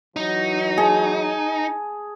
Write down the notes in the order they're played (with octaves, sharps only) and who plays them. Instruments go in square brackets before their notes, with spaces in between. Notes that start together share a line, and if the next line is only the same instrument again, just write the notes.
[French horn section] E3 F#3 [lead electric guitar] D#4
[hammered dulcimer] G#4 A5